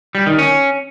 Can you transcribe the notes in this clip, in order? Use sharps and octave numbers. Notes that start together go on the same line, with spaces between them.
G3
D#3
C#4